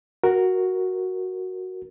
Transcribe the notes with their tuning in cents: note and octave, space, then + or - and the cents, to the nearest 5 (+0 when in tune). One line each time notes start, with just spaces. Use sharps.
F#4 +0 A#4 +0